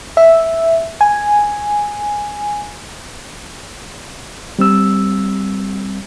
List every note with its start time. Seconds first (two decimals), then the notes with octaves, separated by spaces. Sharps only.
0.17 E5
1.01 G#5
4.59 G3 C4 E6